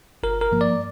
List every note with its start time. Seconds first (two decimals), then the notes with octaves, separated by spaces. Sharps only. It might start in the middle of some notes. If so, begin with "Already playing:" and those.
0.23 G1 A#4
0.41 A#4
0.52 G2 F3 A#3
0.61 D5